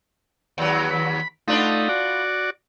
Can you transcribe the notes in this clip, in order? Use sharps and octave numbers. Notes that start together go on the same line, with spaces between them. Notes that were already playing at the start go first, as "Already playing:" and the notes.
D#2 F#3
B5
A3 B3 D4 D#4 F4
F#4 D5